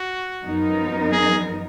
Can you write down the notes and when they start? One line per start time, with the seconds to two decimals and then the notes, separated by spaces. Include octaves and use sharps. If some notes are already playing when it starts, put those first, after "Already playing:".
Already playing: F#4
0.44 F#2 F3 B3 D#4 A#4
1.12 G#4